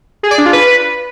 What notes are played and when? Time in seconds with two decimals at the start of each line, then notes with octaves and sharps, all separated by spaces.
0.23 G#4
0.31 D5
0.38 D4
0.45 F4
0.53 B4